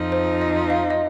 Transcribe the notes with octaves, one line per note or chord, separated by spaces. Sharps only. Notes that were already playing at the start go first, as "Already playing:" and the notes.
Already playing: F2 F3 D#4
C5
D#5
F5
D#5